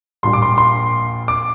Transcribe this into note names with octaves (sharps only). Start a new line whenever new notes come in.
A#1 A#2 G3 C6
D6
C6
C6
D6